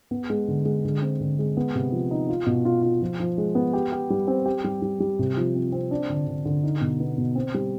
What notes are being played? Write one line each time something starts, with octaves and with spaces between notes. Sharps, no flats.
B3
G#3
D3
G#3
D3
C4
D3
G#3
B3
C3
F3
D#4
F4
B2
F4
F4
F3
F3
G#3
B3
G4
G4
G3
C4
G4
G3
G3
G3
C3
F3
C4
C4
D4
D3
D3
D3
D#4
B2
B3
B2
C4
G3